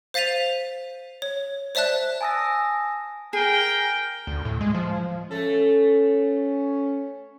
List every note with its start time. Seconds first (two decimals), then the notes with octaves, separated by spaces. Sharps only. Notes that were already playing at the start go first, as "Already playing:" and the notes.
0.14 C5 F5 A6 B6 D#7 F7
1.22 C#5
1.75 C5 D5 E5 A5 F#6
2.21 G#5 A5 D#6 E6 A#6
3.33 G#4 A#4 G5
4.27 D2
4.45 A2
4.61 G#3
4.75 F3
5.31 A3 C#4 A4